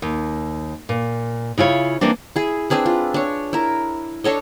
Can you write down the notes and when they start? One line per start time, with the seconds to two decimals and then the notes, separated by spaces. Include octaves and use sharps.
0.02 D#2
0.89 A#2
1.58 C#3 E4 F4 C#5
2.01 E3 A#3 C4 D4
2.36 E4 G#4
2.70 C4 D4 G#4 B4
2.86 F4
3.14 D4 C#5
3.53 E4 A#4
4.24 D4 A4 C#5 D#5